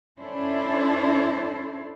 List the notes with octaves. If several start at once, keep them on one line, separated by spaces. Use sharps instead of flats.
C#4 D4 E4 A4 C5